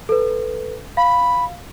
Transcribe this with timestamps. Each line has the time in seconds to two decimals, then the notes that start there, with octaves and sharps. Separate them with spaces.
0.09 A4 B4
0.97 F5 B5